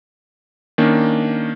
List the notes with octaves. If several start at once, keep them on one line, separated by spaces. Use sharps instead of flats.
D#3 A#3 C#4 D4